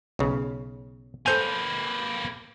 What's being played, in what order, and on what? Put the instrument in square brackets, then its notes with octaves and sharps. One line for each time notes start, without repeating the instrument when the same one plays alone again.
[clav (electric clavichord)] B1 C#3
[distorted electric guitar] A#3 B4 [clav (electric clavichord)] A4 C5 G#5 [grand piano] G6 D#7 F7